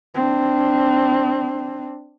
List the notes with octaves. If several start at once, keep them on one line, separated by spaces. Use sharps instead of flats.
C4 D4